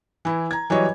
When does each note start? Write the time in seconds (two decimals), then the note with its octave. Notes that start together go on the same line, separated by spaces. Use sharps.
0.25 E3 E4
0.51 A#5 G#6
0.70 E3 F#3 G3 C#5 D#5